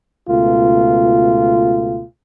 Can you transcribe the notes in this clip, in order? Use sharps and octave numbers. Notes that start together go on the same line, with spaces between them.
C#2 B2 A3 F4